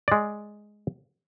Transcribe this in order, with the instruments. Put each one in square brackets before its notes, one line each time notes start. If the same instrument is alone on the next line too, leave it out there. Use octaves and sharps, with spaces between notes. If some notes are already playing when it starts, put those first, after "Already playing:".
[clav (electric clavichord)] G#3 D5